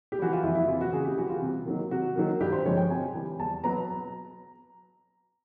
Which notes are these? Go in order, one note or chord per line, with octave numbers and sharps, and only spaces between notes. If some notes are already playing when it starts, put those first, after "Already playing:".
G4
E3 G3 F#4
F4
F2 E4
E4
C3 E3 F4
F#4
C#3 G#4
G4
E3 G3 F#4
F4
C3
D#3 F#3 A#3
C3 F#4
D#3 F#3 A#3
G2 G4
C5
D3 F3 G#3 C#5
G5
C3 G#5
E3 G3
E2 A5
B2 F#3 B3 A#5